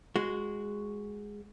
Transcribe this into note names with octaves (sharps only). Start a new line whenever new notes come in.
G#3 F#4